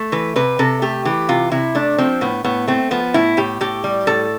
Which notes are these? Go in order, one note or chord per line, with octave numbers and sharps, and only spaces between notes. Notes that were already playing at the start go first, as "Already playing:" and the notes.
Already playing: A3
E3 B4
C3 B4
C3 A4
A3 G4
E3 G4
C3 F4
C3 E4
A3 D4
F3 C4
A2 B3
A2 B3
A3 C4
F3 B3
A2 E4
A2 G4
A2 G4
G3
A2 A4